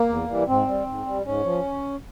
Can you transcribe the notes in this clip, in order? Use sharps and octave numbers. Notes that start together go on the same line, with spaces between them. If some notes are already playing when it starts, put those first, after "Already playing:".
Already playing: A#3
E2
E3 G3
G#2 C4
G3
G#2
G3
G#2 C#4
F3